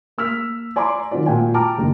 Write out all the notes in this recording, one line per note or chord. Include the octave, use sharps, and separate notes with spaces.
A#3 E6 F6 B6
D5 G#5 A#5 C6 D6
D#3 F#3 C4 F4 D5
A#2 F4 F#4 G5 G#5
G5 A5 A#5 D6 F6
F#1 D#2 D4